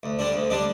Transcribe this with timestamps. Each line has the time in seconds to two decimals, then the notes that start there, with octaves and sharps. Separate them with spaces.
0.03 D2
0.19 D3 G3 D4
0.35 D2
0.50 D3 G3 D4